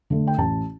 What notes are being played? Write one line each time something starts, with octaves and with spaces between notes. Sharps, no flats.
D3 A3
G5
A1 A5